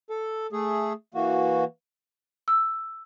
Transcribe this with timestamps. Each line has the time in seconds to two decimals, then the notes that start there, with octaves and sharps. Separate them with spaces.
0.10 A4
0.53 A3 G#4
1.14 E3 A#3 F#4
2.48 E6